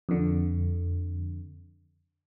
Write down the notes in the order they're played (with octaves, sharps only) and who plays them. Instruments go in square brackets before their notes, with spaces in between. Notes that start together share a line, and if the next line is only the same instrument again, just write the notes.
[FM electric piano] F2 D3